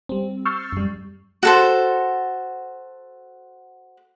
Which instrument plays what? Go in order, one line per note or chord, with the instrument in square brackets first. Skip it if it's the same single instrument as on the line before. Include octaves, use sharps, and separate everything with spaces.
[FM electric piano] G3 C4
C#6 E6 F6 G6 A6 C7
F#2 G3
[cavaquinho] F#4 A4 C5